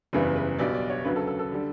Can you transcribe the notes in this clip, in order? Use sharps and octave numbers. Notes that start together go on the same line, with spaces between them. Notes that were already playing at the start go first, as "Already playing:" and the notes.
F#1 E2 C#3 E3 G3 B4
B4
B1 B2 G3 D5
D5
C#5
D2 C#3 F#3 B4
A4
A4
A4
D3 G3